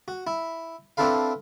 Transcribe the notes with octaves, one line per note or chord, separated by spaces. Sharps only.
F#4
E4
C4 D4 E4 A4 B4 F5